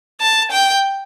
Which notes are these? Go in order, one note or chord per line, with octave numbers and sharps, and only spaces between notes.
A5
G5